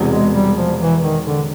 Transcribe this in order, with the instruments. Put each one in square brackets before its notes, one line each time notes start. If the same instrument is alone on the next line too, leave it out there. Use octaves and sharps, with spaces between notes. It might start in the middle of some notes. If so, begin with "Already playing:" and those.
Already playing: [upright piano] E1 E2 C3
[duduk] G#3
G3
F3
E3
D#3
D3